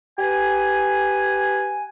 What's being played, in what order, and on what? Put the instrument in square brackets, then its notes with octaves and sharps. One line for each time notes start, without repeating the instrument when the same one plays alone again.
[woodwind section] G4 B4 G#5